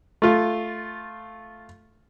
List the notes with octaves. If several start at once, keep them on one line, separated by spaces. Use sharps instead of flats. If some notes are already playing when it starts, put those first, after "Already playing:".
A3 F4